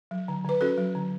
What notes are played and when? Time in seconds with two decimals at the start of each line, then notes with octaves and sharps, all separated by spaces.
0.11 F#3
0.28 D3
0.45 D3 B4
0.61 C#4 F#4 A4
0.78 F#3
0.95 D3